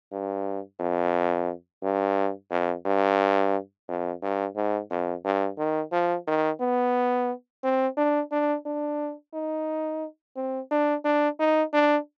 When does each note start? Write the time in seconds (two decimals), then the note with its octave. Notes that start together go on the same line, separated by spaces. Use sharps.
0.12 G2
0.80 F2
1.83 G2
2.51 F2
2.85 G2
3.88 F2
4.22 G2
4.56 G#2
4.90 F2
5.25 G2
5.58 D#3
5.92 F3
6.27 D#3
6.61 B3
7.64 C4
7.97 D4
8.32 D4
8.66 D4
9.33 D#4
10.36 C4
10.71 D4
11.05 D4
11.39 D#4
11.73 D4